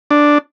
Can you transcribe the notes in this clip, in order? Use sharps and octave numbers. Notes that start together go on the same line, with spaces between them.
D4